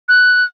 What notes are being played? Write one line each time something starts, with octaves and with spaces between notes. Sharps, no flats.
F#6